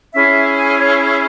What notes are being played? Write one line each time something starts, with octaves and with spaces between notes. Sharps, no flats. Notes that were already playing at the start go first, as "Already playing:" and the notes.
C#4 E4 G#4 E5
G#5
C#5
C#5